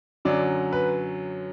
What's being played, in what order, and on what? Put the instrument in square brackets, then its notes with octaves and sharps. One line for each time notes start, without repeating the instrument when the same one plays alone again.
[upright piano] F#2 D3 F#3 D5
B4